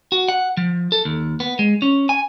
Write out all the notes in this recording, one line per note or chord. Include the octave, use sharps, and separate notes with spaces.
F#4
F#5
F3
A4
D#2
B3
G#3
C#4
G#5